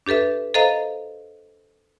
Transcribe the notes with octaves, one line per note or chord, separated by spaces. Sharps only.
D4 G4 A4 B4 E5
A4 C5 D#5 F5 A#5